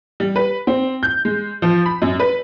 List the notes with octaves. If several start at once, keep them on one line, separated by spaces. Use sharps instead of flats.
G3
B4
C4
G6
G#3
F3
B5
F#2
B4